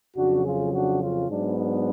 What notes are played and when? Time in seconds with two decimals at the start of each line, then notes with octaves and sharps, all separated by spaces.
0.16 F2 C#3 F#3 D4 F#4
0.45 F4 G#4
0.73 D4 F#4
1.01 C#4 F4
1.29 G#2 F#3 B3 D4
1.58 D4